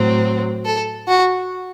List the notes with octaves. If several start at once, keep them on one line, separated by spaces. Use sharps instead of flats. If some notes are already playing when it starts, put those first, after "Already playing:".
Already playing: A2 F#3 C4
A4
F#4